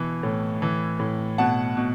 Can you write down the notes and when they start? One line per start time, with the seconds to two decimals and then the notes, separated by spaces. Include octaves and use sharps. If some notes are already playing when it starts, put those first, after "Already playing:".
Already playing: B2 E3
0.23 A2
0.62 E3
1.00 A2
1.38 B2 F#5 A5
1.77 B2